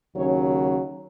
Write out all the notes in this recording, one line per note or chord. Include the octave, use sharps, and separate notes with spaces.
D#2 C#3 F#3 C#4 C#5